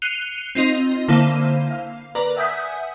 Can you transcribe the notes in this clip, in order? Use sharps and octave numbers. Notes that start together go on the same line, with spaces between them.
F#6 C7 C#7 D#7 F7 G7
C4 D#4 F4 D#5 C6
D3 A#3 E4 C5 F5 D#7
F5
A#4 B4 D5 A#5
E5 F#5 G#5 D#6 G6 B6